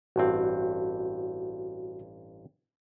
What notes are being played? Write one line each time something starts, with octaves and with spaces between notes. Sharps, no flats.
A1 G2 C4 F#4